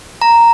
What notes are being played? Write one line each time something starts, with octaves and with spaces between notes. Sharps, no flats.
A#5